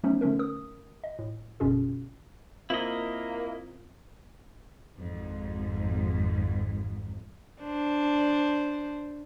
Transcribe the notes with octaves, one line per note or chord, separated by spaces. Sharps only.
F3 F#3 A3 B3 C#4 D#4
D3 F3 A3 C#4 A#4
A#4 D#6
D#5
A2
G1 F#2 B2 C#4 F4 G#4
A#3 C4 E4 F4 D#5
G#1 F2 G#2
D4 C5